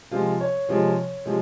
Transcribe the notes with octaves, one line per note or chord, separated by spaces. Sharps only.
C3 F3 G#3 F4
C#5
C3 F3 G#3
C3 F3 G#3